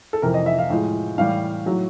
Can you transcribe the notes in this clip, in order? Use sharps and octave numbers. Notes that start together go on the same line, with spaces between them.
A4
F2 C3 E3 A#4
D#5
E5
F5
A2 F3 G#3
A2 E3 G3 F5
A2 F#3